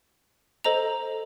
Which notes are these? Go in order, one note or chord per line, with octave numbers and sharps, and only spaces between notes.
A4 C5 D#5 A#5 F7